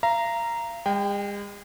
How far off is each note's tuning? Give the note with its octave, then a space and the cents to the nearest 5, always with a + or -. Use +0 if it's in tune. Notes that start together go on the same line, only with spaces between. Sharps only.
F5 -40 A#5 +0
G#3 -40 G5 +15